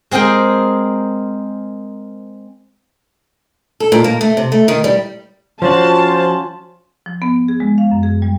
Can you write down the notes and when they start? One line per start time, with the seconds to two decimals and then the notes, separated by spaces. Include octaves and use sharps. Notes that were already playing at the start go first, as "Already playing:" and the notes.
0.11 G#3 C4 G#4 A#4 G5
3.80 A4
3.92 A#2
4.04 A#3
4.21 A3
4.37 C3
4.52 A3
4.68 D#3
4.84 G3
5.62 F3 C#4 F4 F#4 C5 A5
7.06 F3
7.22 B3
7.48 G#4
7.60 G#3
7.78 F5
7.92 F#2
8.03 G#4
8.22 G3